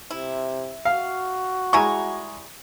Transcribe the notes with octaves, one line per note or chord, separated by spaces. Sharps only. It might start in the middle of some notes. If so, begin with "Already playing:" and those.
C3 E4
F#4 F5
G3 G#3 E4 G#5 A#5 C#6